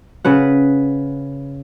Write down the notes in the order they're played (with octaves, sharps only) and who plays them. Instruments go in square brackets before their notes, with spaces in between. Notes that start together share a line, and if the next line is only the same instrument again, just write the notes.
[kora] C#3 B4 F#5